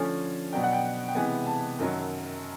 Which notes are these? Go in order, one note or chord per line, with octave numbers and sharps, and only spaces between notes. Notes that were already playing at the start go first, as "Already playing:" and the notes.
Already playing: D3 F3 A3 C#4 G#5
B2 F#3 B3 D4 G5
F#5
G5
G5
C3 E3 G#3 B3 G#5
A5
F#2 D#3 F#3